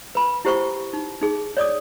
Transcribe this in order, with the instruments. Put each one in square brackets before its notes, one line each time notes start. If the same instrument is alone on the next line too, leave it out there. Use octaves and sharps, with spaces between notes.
[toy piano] B4 B5
E4 G4 C5 G5 C#6
D#4
D#4 G#4
C#5 D5 D6 D#6